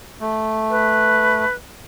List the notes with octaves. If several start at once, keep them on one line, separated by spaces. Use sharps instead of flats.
A3
B4